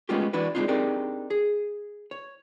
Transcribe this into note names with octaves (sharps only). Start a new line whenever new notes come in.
G#3 A3 B3 C#4 F4 G4
E3 D4 E4 F#4 B4
G#3 A#3 C4 D4 D#4 F4
C4 D4 D#4 G4 G#4 A#4
G#4
C#5